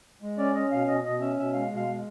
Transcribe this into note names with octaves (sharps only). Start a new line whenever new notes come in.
G#3
C#4 D5
C#4 D#5
B2 F5
B2 D#5
B2 D#5
C#4 E5
B2 E5
G#3 F5
B2
F5
G#3